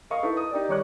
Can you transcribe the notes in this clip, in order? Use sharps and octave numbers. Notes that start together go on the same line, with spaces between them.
A#4 D#5 F5 C#6 D#6
D#4 E4 A4 B4
D#6
D#4 G4 A#4 D5
D#3 G3 C#5 C#6 D6 F#6